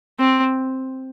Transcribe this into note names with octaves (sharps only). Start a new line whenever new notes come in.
C4